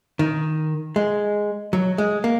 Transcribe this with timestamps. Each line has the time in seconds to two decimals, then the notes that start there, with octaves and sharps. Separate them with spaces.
0.19 D#3
0.96 G#3
1.73 F#3
1.98 G#3
2.24 A#3